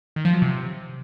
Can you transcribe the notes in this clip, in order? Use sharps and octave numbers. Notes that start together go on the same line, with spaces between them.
D#3
F3
F#3
C3